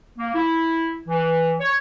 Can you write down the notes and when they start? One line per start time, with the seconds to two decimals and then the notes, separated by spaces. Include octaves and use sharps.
0.18 A#3
0.35 E4
1.08 E3
1.59 C#5